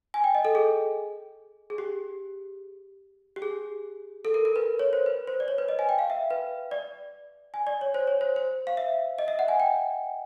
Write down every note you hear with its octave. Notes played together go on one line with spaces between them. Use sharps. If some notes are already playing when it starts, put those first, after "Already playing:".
G#5
G5
D#5
A4
G#4
G#4
G4
G4
G#4
A4
A#4
A#4
B4
C#5
C5
B4
C5
D5
C#5
B4
D#5
G#5
G5
F5
E5
B4
D5
G#5
D5
C#5
C5
C#5
C5
C5
F5
E5
D#5
E5
F#5
G#5
G5